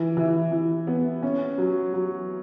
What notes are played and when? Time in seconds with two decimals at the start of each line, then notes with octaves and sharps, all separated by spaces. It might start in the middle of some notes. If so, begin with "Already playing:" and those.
Already playing: E3
0.17 E3
0.52 E3
0.87 B3
1.23 C#4
1.58 F#3
1.93 F#3